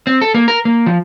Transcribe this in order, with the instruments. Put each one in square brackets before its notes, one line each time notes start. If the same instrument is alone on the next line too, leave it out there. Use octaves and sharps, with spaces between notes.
[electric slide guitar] C4
A4
A#3
A#4
A#3
F3